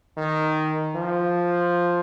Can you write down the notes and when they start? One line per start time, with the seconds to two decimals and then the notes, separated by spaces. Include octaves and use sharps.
0.17 D#3
0.96 F3